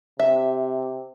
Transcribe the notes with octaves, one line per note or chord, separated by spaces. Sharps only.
C3 E5